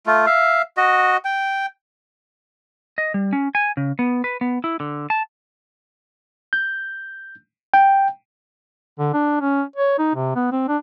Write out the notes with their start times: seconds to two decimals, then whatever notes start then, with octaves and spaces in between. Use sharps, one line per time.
0.06 A3 F4
0.26 E5 F5
0.77 F#4 D#5
1.25 G5
2.98 D#5
3.14 G3
3.33 C#4
3.55 G#5
3.77 C#3
3.99 B3
4.24 B4
4.41 B3
4.64 E4
4.80 D3
5.10 A5
6.53 G6
7.74 G5
8.99 D3
9.13 D4
9.41 C#4
9.76 C#5
9.99 D#4
10.15 C3
10.36 B3
10.52 C4
10.68 D4